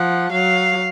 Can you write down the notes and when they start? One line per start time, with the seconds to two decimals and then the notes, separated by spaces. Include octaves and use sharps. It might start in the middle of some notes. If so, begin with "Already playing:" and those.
Already playing: F3 F#5
0.32 F#3 F5